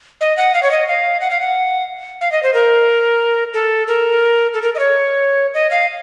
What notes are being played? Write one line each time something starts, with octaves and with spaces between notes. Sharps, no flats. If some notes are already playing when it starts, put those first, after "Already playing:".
D#5
F#5
F5
C#5
D#5
F5
F#5
F5
F#5
F5
D#5
C5
A#4
A4
A#4
A4
A#4
D#5
C#5
D#5
F5